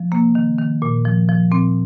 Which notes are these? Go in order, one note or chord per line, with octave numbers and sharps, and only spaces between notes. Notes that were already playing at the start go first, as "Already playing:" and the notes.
Already playing: F3
C3 A#3
D#3
D#3
A#2
F3
F3
A#2 C4